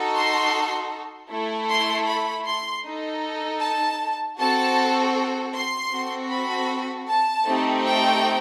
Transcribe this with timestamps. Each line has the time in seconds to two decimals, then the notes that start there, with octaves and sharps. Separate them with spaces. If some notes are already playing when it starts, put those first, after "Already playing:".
Already playing: D#4 F#4 A4
0.15 C6
1.30 A3 E4 A4
1.69 C6
2.06 B5
2.46 C6
2.85 D#4 A4
3.61 A5
4.38 C4 F#4 A4 A5
5.54 C6
5.91 C4 F#4 A4
6.31 B5
7.07 A5
7.46 A3 C4 D#4 G4
7.84 G5